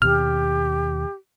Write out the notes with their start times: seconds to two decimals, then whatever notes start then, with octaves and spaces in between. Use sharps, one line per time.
0.02 D#2 B2 G4 F6